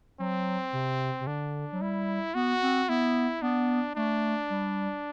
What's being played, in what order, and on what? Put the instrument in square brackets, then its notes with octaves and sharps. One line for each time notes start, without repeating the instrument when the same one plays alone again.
[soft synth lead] F#3 [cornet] C4
[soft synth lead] C3
C3
[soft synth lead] D3 [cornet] D4
[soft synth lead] F#3
[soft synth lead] G3 [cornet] E4
[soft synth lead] B3 [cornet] F#4
[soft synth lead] C4
[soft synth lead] B3 [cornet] E4
[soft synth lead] B3 [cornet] D4
[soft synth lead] A3 [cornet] D4
[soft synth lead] G3